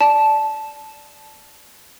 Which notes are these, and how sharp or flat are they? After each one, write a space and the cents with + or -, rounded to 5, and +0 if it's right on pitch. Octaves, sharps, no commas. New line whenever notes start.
D5 -5 A5 -10